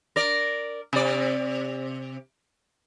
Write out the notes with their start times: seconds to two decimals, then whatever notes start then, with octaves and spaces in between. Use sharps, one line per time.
0.16 A#4 D5
0.93 C3 D5